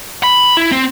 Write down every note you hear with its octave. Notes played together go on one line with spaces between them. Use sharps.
B5
E4
C4